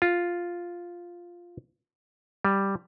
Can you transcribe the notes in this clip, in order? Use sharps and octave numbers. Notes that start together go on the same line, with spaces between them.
F4
G3